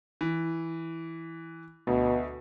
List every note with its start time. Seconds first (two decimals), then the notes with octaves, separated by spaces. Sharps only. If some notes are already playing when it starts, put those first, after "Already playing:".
0.21 E3
1.87 D2 B2